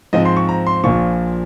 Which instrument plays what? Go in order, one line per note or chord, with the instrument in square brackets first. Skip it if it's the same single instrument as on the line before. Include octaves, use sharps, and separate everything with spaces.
[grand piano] G#2 F3 C4 D#5
C6
C#6
A#5
C6
A#1 A#2 F3 C#6